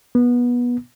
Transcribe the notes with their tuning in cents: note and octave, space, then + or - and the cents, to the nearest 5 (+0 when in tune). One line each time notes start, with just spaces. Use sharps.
B3 -20